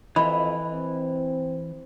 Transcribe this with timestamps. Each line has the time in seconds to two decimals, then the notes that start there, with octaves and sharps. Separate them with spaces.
0.16 F2 E3 D#5 B5
0.72 C4